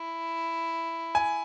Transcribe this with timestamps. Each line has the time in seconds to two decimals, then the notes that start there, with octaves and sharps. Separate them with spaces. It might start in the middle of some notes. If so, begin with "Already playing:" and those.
Already playing: E4
1.15 G#5